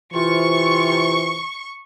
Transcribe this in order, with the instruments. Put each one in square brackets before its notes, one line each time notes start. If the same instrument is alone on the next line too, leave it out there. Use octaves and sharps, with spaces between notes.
[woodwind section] C3 F4 [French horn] E3 [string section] C#6